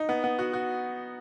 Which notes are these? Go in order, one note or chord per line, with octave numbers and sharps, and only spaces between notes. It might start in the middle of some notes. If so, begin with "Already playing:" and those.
Already playing: D#4
B3
B3
F#4
F#4